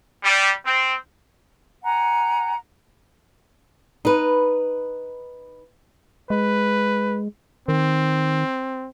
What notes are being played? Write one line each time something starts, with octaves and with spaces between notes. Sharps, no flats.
G3
C4
F#5 G#5 A#5
D#4 B4
G#3 B4
D#3 C4